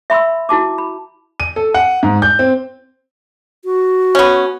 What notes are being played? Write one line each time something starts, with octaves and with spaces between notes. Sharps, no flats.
E5 B5 C6 E6
E4 F#4 A5 D6
B5
D#7
A4
F#5
G#2
G6
C4
F#4
B3 C#4